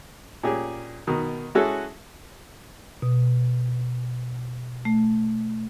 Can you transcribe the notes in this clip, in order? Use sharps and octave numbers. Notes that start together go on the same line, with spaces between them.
A#2 C#4 G4 G#4
B2 D#3
G#3 C#4 E4 F#4 G#4 A4
B2
A3